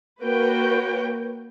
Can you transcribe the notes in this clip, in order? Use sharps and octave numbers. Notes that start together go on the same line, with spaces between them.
A#3 F#4 B4 C#5 G5